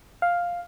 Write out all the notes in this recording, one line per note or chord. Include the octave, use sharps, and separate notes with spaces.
F5